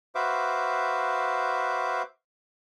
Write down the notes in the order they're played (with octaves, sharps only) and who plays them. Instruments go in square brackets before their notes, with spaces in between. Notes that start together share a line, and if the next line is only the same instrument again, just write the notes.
[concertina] F#4 B4 C5 E5 F5 D6